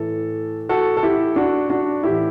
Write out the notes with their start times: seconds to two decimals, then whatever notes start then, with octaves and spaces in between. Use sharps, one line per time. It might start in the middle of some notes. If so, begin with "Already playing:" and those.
Already playing: A2 E3 A4
0.69 F#4 A4
0.97 A4
1.03 E4 G4
1.36 D4 F#4
1.70 D4 F#4
2.03 A2 E3 E4 G4